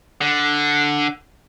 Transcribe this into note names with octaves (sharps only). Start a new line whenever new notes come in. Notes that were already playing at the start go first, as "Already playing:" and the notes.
D3